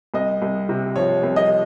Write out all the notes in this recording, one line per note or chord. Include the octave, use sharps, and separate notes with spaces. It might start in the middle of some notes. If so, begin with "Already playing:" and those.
C2 D#5
C2
C3
F3 C#5
C2
D#5